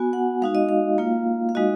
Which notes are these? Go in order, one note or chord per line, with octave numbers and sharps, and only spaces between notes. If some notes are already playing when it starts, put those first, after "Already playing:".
Already playing: B3 F#4 G#5
F#5
G#3 D#4 F#4 F5
D#5
F5
A#3 F4
F5
G#3 D#4 F#4 D#5